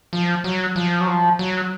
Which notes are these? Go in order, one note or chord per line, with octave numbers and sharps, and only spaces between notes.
F3
F#3
F3
F#3
F3
F#3